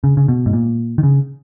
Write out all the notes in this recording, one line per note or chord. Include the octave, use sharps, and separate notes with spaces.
C#3
C#3
B2
G#2
A#2
D#3
C#3